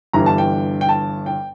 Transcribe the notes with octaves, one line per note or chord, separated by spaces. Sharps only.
G1 G2 E3 G3 A#5
A5
G5
G5
A5
G5